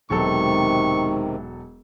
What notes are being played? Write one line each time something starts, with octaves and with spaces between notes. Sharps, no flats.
E1 G#2 C3 D#3 F#3 A4 C#6